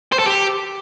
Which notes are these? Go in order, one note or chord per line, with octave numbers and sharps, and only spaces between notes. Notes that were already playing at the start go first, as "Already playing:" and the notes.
C5
A4
G4